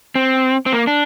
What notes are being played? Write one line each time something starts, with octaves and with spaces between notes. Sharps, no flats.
C4
C4
A#3
D4